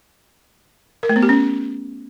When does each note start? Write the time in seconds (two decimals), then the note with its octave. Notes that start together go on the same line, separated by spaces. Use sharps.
1.03 A#4
1.09 A3
1.16 B3
1.23 G4
1.29 C#4